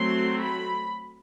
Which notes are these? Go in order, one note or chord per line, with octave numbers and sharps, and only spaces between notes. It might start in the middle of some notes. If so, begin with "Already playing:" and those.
Already playing: F#3 A3 C4 C6
B5